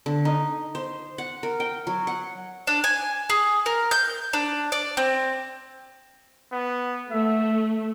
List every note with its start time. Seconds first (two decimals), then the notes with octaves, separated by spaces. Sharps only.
0.06 D3
0.25 D#4
0.75 C5
1.18 F#5
1.43 A#4
1.60 G5
1.87 F#3
2.07 F#5
2.67 D4
2.84 G#5
3.30 G#4
3.66 A#4
3.91 G6
4.33 D4
4.72 D5
4.97 C4
6.52 B3
7.11 A3 E5